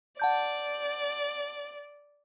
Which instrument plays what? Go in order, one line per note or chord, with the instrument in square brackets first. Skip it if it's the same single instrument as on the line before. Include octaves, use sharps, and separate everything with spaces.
[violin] D5 [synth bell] F#5 A5 G6